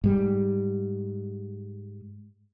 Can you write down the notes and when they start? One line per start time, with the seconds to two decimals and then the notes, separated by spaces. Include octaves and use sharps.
0.04 G#2 G3